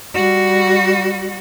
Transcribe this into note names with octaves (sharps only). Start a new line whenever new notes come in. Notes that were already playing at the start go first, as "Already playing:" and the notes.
G3 F#4